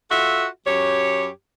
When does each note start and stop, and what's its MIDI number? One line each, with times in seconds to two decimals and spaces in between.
0.10 0.46 65
0.10 0.46 66
0.10 0.46 69
0.10 0.46 76
0.67 1.28 42
0.67 1.28 67
0.67 1.28 73